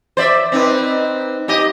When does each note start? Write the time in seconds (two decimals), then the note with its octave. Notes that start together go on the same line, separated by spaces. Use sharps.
0.17 C5 D5 E5
0.52 C4 D#4 B4
1.48 D#4 G4 D#5